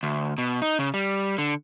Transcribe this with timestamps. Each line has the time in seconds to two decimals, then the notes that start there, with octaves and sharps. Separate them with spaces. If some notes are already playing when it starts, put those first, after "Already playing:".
0.03 D2
0.38 B2
0.62 D#4
0.79 C#3
0.94 G3
1.38 D3